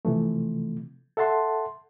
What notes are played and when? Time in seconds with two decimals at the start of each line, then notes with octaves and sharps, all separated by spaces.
0.05 C3 E3 F3 A3
1.17 A4 E5 F#5 A5 C6